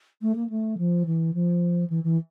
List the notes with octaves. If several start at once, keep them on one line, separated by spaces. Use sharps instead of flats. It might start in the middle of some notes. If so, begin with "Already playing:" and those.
A3
A#3
A3
F3
E3
F3
E3
E3